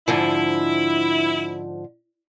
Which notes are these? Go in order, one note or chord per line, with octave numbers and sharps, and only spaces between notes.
G#2 D3 F3 E4